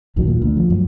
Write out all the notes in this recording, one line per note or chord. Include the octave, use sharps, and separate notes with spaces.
A#1 D#2 D#3 F#3
A#2
D2
F3
F#2